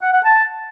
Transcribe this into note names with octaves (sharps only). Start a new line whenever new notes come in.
F#5
F#5
A5